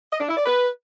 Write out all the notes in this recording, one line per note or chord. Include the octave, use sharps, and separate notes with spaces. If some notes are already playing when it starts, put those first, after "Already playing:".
D#5
D4
E4
D5
B4